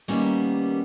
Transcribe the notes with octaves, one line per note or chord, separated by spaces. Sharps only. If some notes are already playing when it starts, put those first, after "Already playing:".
D#3 G3 A#3 B3 C#4